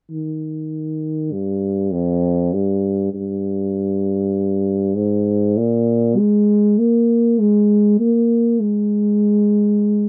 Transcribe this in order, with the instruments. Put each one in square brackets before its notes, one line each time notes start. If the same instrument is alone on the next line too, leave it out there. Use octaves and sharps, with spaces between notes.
[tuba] D#3
G2
F2
G2
G2
G#2
A#2
G#3
A#3
G#3
A#3
G#3